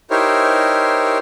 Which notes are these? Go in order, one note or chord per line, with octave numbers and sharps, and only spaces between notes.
D#4 E4 G4 A#4 C5 C#5